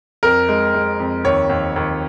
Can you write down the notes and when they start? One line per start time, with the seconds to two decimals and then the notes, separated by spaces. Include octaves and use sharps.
0.23 F2 A#4
0.49 G#3
0.74 G#3
1.00 F2
1.24 D#2 C#5
1.49 D#2
1.76 D#2